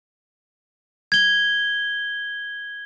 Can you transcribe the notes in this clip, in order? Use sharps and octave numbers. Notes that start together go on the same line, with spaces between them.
G#6 G7